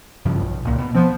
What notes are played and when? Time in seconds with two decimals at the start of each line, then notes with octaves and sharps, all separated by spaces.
0.25 G2 C#3 F3
0.42 B1
0.65 C#2 A#2
0.78 B2
0.95 F3 B3 C4